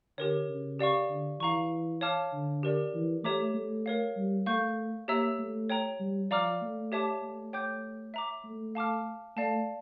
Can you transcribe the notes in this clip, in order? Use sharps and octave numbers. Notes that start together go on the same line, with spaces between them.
D3 G4 A#4 C#5
C#3
G4 D5 F5 C#6
D3
E3 F5 A#5 C#6
C#5 F5 A5 D6 F6
D3
G4 A#4 D5
E3
A3 G4 C#5 E5 A#5 D6
A3
A#4 C#5 F5
G3
A3 F5 C#6 G6
A#3 G4 C#5 E5 A#5 E6
A3
C#5 G5 A#5
G3
F3 D5 F5 A#5 D6 F6
A3
G4 C#5 E5 A5 D6
A3
C#5 G5 D6 G6
E5 A#5 D6
A3
F5 A5 D6 F6
A3 D5 F5 A5